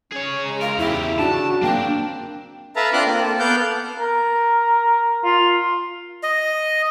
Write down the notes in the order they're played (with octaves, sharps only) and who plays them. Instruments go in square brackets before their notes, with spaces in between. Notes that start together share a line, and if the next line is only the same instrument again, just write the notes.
[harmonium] C#4 [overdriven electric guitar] G#4 C#5
[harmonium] C#3 G#3 A#5
[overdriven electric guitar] A#4 [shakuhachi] F5
[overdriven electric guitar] E2 G4 [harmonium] C#3 [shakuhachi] E4
[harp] D4 [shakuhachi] F#4 [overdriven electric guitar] A5
[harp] A#3 C4 [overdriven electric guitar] D4 [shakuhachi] G5
[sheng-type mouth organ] A4 B4 E5 F5 A5 A#5
C4 D4 F4 C6 D6 F#6
A#3 C4
A4
B3 A4 F5 F#5 D6 G6
[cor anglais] A#4
F4
[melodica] D#5